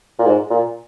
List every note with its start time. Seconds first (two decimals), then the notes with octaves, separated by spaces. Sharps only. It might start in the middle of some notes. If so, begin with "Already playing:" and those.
0.19 A#2
0.26 G#2
0.50 A#2